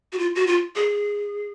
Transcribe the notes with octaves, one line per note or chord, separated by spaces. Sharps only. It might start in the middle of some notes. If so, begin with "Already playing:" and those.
F#4
F4
F#4
F4
G#4